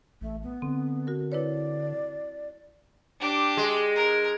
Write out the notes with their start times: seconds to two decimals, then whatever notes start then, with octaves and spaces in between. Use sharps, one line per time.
0.21 A1 A3
0.43 B3
0.62 D3 C4
1.07 F#4 A#4
1.32 E4 B4 C#5 D5
3.20 D4 G4
3.57 G#3
3.96 A#4